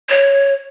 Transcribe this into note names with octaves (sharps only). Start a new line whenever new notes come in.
C#5